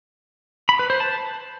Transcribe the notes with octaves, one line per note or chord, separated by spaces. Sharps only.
B5
B4
C5
A5